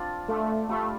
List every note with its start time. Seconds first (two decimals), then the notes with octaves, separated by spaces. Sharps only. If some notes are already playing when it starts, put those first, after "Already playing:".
Already playing: C4 D4 F4 D5
0.28 A3 D4 F4 D5
0.69 G3 A3 F4 D5 F5